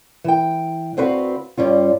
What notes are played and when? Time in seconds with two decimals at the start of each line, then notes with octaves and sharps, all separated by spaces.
0.24 E3 G5
0.97 D2 C4 F#4 B4 F5
1.57 G2 G3 C#4 F4